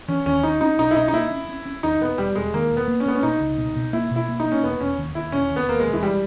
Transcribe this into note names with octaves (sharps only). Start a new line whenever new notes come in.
E3 C#4
D#2 C#4
C#4 D#4
C#4 D#4
B1 D#4
E4
B2 D#4
D#4
A#3 E4
C#4
C#4
C#4
D#2 D#4
E1 B3
E1 G3
E1 G#3
D#3 A#3
E1
B3
A#3
C#4
A#3 B3
C#4
B2 D#4
C#2
B2
B2
A#3 E4
B2
E4
A#3
D#4
A#3
C#4
E1 B3
E1 C#4
D#2
D#2 E4
E1 C#4
D#2
B3
D#2 A#3
G#3
E1
E3
G3 G#3